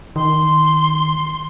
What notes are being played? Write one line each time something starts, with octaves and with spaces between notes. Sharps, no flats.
D#3 C6